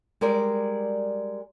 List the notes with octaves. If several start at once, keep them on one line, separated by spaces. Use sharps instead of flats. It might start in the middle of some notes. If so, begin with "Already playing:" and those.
G3 G#3 A#4 D5